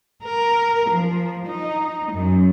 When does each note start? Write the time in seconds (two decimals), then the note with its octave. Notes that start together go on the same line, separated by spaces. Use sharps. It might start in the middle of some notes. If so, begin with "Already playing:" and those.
0.24 A#4
0.89 F3
1.46 D#4
2.12 F#2